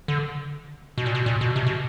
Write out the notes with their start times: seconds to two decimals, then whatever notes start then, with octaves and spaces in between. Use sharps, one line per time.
0.08 D3
0.98 B2
1.06 A#2
1.15 B2
1.26 A#2
1.41 B2
1.56 C3
1.66 B2